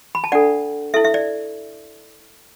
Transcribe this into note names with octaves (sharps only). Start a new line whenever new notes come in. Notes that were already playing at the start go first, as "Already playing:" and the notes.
B5
A5
D4 A4 D5 F#5
E4 A4 E5
E5
D5